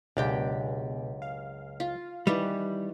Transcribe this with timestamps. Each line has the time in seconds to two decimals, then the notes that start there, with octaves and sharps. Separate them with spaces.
0.17 C#2 F#2 B2 D4 G4 G5
1.22 F5
1.80 F4
2.27 D#3 E3 G3 B4